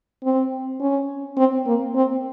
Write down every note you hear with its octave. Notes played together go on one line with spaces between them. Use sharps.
C4
C#4
C4
A#3
C4